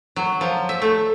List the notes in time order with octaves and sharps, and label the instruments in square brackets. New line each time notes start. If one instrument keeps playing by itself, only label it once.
[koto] F#3
F3
E5
A3